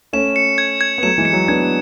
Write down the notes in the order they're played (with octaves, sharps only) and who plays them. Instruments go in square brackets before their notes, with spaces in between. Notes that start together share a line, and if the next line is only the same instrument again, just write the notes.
[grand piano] A3 C#4 [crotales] E7
[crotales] C#7
G#6
G#6
[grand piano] B3
[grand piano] F#3 A3 [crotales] E7
[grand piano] E3 G#3
[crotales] C#7
[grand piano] F#3
[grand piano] B3 D4 [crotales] G#6